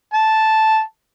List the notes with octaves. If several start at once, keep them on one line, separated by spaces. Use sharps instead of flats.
A5